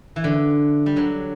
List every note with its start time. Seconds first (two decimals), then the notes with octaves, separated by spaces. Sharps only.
0.16 E3
0.24 D3
0.86 G3
0.96 D3 F#3